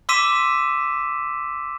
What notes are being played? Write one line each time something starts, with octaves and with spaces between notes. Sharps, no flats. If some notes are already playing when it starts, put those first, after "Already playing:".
C6 D6 E6 B6 D#7 E7